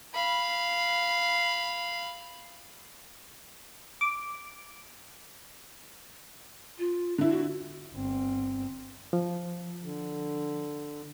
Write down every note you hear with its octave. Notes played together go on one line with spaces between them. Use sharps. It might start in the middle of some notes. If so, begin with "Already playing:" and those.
F5 B5
D6
F4
D3 E4
F#4
G1 C4
F3
D3